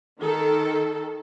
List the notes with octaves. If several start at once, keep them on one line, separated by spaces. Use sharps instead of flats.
D#3 A4